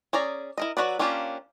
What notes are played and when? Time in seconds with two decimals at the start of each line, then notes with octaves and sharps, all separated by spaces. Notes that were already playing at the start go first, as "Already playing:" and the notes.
0.13 C#4 G#4 D5 A#5
0.58 E4 A#4 D#5
0.77 F#3 D#4 F#4 B4 D5
0.99 A#3 C#4 D4 F4 G4